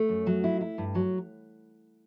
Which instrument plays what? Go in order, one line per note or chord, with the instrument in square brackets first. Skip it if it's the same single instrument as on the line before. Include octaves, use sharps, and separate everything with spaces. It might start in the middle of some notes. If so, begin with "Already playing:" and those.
Already playing: [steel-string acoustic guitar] A3
F#2
F#3
E4
E4
G2
F#3